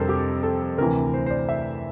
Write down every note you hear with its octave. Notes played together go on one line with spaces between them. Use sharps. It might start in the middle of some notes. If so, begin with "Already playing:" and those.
Already playing: F2 C3 G3 D4 A4 A#4 C5
G4
A4
D2 C3 E3 A#4
C5
C5
D5
E5